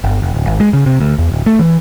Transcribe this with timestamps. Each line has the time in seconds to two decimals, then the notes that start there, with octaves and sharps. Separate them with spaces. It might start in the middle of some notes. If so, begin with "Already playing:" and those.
0.04 G1
0.22 F1
0.34 D1
0.47 G#1
0.60 G#3
0.73 C#3
0.86 C3
1.01 D2
1.19 E2
1.32 D1
1.46 A3
1.59 E3